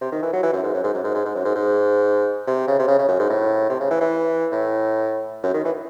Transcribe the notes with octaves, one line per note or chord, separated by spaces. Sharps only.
C3
D#3
E3
F#3
E3
F#2
G#2
F#2
G#2
F#2
G#2
G#2
G#2
F#2
G#2
G#2
C3
C#3
C3
C#3
C#3
F#2
G#2
A2
C3
C#3
E3
E3
A2
F#2
D#3
E3